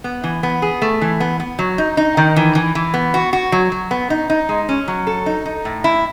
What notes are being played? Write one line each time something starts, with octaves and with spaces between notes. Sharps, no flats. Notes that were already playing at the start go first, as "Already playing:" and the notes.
B3
E3
B3
G#4
A3
E3
B3
B3
F#3
D#4
D#4
D#3
E3
E3
E3
B3
F#4
F#4
F#3
F#3
B3
D#4
D#4
G#3
C#4
F#3
A4
D#4
D#4
A2
E4